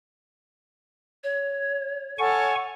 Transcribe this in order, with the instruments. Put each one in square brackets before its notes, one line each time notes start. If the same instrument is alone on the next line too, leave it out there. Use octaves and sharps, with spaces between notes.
[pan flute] C#5
[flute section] A4 C#5 F6 [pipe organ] F#5 G#5 C#6